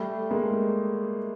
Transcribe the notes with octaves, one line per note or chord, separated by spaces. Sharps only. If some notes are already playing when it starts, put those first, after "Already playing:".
Already playing: G3 A3
G#3 A#3